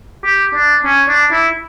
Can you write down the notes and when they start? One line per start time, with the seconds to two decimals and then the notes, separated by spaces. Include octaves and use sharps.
0.24 G4
0.55 D4
0.85 C#4
1.09 D4
1.32 E4